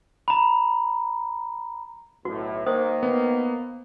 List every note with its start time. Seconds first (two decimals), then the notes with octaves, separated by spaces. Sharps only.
0.28 A#5 B5
2.25 B1 A2 F#4
2.66 D#3 A#3 C5 D#6
3.03 B3